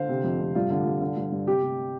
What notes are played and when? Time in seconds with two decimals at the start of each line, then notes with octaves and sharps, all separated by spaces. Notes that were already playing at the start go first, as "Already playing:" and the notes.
Already playing: D3 C5 F5
0.09 C3
0.24 F2
0.40 C3
0.55 G2 F4
0.70 D3
0.86 G2
1.01 D3
1.17 G2
1.32 G2
1.46 C3 G4
1.62 C3